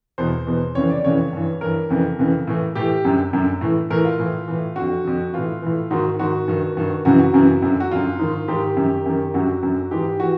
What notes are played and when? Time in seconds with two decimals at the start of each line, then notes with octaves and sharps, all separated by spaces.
0.18 E2 B2 C5
0.47 E2 B2
0.75 F2 C#3 E3 C#5
0.90 D5
1.04 F2 C#3 E3 C#5
1.33 G2 E3
1.61 G2 E3 A#4
1.90 F2 C#3 E3
2.19 F2 C#3 E3
2.47 A2 E3
2.75 A2 E3 G4
3.05 F#2 D3
3.33 F#2 D3
3.61 A2 E3
3.90 A2 E3 A#4
4.05 F4
4.19 A2 E3
4.48 A2 E3
4.76 F2 D3 F#4
5.04 F2 D3
5.34 A2 E3 F4
5.62 A2 E3
5.91 G#2 D#3 F#4
6.19 G#2 D#3 F#4
6.48 G2 D#3
6.77 G2 D#3
7.05 F#2 C#3 E3 F#4
7.19 F#4
7.34 F#2 C#3 E3
7.62 F#2 D3
7.80 F#4
7.91 F#2 D3 F4
8.19 G#2 D#3
8.48 G#2 D#3 G4
8.77 F#2 D#3
9.06 F#2 D#3
9.34 F#2 D3 F#4
9.63 F#2 D3
9.91 G#2 E3 G4
10.20 E3 F#4